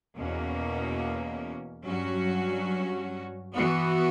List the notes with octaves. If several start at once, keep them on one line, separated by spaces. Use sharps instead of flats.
E2 B2 A#3 C#4
G2 F#3 C#4 F#4
E3 B3 F#4